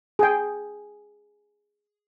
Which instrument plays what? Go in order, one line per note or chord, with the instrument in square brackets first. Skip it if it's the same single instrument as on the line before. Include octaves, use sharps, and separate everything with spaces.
[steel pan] G#4 G5